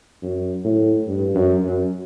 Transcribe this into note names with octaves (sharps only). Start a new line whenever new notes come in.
F#2
A2
G2
F#2
F#2